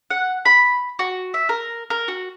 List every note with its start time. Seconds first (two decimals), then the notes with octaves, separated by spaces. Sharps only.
0.11 F#5
0.45 B5
0.99 F#4
1.34 E5
1.49 A#4
1.90 A#4
2.08 F#4